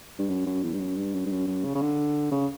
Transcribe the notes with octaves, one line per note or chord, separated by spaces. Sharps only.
G2
F#2
F#2
E2
G2
F#2
G2
F#2
G2
F#2
F#2
C#3
C#3
D3
C#3